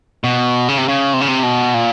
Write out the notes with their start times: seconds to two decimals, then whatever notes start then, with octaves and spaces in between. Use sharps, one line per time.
0.24 B2
0.68 C#3
0.78 C3
0.88 C#3
1.14 C3
1.21 C#3
1.28 C3
1.43 B2
1.74 A#2